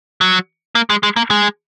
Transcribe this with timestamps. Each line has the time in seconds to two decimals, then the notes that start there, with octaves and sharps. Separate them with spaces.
0.21 F#3
0.75 A#3
0.90 G#3
1.03 G#3
1.16 A#3
1.31 G#3